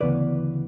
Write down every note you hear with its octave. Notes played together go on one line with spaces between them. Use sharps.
D2 C#3 E3 B3 B4 D5